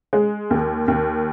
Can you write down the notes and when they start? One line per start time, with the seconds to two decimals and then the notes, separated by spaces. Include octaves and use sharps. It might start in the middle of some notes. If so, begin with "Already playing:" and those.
0.13 G#3
0.50 D#2
0.88 D#2